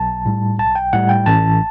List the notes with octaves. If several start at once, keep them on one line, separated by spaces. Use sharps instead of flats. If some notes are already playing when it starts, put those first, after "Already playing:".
Already playing: B1 A5
A2 G3
B1 A5
G5
A2 G3 F#5
G5
A1 A5